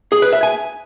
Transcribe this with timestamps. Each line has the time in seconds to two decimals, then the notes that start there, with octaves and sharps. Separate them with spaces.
0.12 G#4
0.22 B4
0.33 E5
0.43 G#5